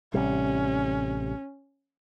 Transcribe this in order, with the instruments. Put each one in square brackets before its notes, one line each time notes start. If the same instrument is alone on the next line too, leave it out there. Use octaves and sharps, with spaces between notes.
[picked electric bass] A1 C3 G3 [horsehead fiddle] C#4